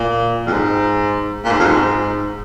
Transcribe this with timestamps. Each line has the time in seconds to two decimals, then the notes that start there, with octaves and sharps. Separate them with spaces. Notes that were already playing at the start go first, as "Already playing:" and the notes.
Already playing: A#2
0.46 F2
0.53 G#2
1.44 A#2
1.51 G#2
1.60 F2
1.66 G#2